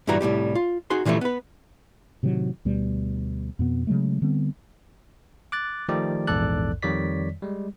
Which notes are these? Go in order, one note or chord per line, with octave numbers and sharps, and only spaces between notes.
G2 A#2 E3 G3 F#4 A#5
C2 A2 G3 G4
F4
D#4 F#4 G#4 C6
A#2 E3 F3 G3 A3
B3 B4
A2 C3 D#3 F#3
D2 B2 G3
F2 B2 B3
C#3 F#3 G#3 A3
D3 G3 B3 C4
D6 F#6 A6
D#3 F3 A3 D#4 G4 D5
A#1 E2 G#2 A4 D5 F#6
F2 D#3 G3 C#5 D5 B6
G3 G#3